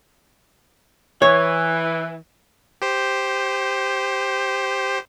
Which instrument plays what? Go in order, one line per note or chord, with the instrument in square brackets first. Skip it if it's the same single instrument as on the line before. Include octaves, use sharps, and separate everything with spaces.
[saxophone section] E3 [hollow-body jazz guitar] C#5
[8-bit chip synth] G4 C5